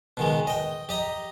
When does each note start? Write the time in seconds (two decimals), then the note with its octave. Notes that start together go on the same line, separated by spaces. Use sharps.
0.17 B2 D#3 G#3
0.47 D#5 G5
0.89 G4 D#5 A#5